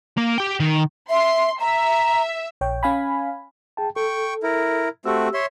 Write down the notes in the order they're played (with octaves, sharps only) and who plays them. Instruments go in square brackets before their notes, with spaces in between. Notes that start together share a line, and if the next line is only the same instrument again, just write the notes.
[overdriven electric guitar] A#3
G4 G5
D#3
[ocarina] E5 [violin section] C6
[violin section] E5 [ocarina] A#5
[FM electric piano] A#1 C#5 G5
C#4 F5 G#5 B5
[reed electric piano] G#4 G5 A5
[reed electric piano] A4 [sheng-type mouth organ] G5 C#6
[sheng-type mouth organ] E4 A#4
[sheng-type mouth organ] A3 C4 F#4 [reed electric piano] G4 E6
[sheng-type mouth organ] C#5 E5 C6